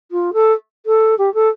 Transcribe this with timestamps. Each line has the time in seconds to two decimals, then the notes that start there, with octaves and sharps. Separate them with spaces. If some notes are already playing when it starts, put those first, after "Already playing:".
0.11 F4
0.33 A4
0.86 A4
1.18 G4
1.34 A4